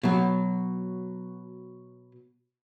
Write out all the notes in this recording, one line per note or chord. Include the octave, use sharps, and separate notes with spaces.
B2 F#3